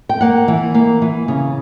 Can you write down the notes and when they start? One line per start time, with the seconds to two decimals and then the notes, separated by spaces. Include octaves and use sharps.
0.09 G5
0.21 A#3 F#5
0.48 E3
0.74 A#3
1.02 E3
1.28 C#3